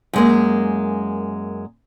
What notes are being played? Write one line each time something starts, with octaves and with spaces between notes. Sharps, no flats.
F#2 G#3 A#3